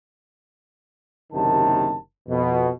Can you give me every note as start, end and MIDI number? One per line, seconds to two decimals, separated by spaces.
1.33 1.95 30
1.33 1.95 39
1.33 1.95 48
1.33 1.95 51
1.33 1.95 81
2.29 2.69 41
2.29 2.69 47